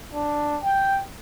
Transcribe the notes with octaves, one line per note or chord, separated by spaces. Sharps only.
D4
G5